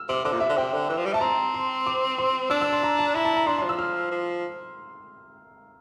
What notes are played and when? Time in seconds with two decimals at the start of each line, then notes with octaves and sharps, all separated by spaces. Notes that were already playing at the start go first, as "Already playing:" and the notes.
Already playing: E6 F6
0.09 C3 D6
0.25 D3 D6
0.33 A#2
0.40 C3 E5
0.49 D3
0.57 C3 G5
0.74 D3
0.89 E3
0.98 F3
1.05 G3
1.13 A3 A5
1.21 C4 A#5
1.54 C6
1.87 D6
2.18 C6
2.50 D4 E6
2.61 E6
2.72 C6
2.83 A#5
2.99 A5
3.14 E4 A#5
3.25 A5
3.37 A#5
3.47 D4 C6
3.58 C6
3.63 F3
3.69 E6
3.79 F6
4.11 F3